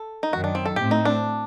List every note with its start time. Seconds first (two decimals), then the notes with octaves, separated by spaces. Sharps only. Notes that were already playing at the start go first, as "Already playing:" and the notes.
Already playing: A4
0.23 D#4
0.33 F#2 D#3 F#3 F#4
0.44 D4
0.55 C4
0.66 A4
0.76 A2 A3 C4 G4
0.91 D#4
1.05 D4